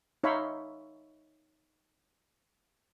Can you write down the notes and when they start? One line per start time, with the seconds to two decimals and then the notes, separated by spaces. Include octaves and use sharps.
0.23 D#4 C#5 E5 F5 B5 C6